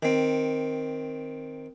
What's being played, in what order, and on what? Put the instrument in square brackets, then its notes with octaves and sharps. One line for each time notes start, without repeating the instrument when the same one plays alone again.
[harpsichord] D#3 C4